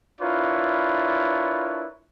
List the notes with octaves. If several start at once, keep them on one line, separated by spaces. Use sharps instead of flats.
D4 E4 F4 A#4 B4 C#5